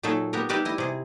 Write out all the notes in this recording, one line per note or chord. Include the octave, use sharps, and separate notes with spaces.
A#2 F#3 D#4 G#4 A4 E5
B3 G4 A#4
G3 D#4 G4 B4 D5 E5
E4 D#5
C3 G#4